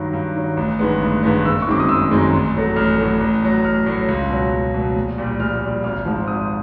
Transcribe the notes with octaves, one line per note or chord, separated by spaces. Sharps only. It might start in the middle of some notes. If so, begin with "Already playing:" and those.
Already playing: G2 D#3 F#3
G2
D#3 F#3
A1
G2 D#3 G#3 B3
A1
G2 D#3 G#3 B3
F#1 E6
C#6
F#2 D#3 G#3 C4 D6
D#6
F#1 E6
F#2 D#3 G#3 C4
A1
A2 F#3 A3
A1 F6
A2 F#3 A3
A1
A2 F#3
A1 F6
A2 F#3
C#2
B2 F#3
C#2
B2 F#3
A#1
A#2 G3
A#1 F6
A#2 G3
G#1 F6
G#2 F3
G#1 D#6